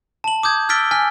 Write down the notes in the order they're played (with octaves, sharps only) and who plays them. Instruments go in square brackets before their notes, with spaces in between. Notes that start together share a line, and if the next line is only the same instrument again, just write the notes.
[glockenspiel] A5 F#7
D6 D#6 G6 G#6
E6 F6 A6 B6 D7 G7
G#5 F6 B6